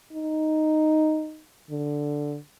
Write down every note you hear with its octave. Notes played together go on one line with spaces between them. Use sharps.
D#4
D3